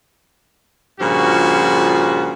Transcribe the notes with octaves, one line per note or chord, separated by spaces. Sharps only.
G2 A#2 C#3 F3 F#4